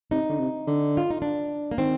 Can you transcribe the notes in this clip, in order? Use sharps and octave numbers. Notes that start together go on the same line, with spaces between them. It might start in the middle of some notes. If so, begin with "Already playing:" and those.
C3 D#4
D3
C3
D3
F4
D#4
D4
A#3
D#3 C4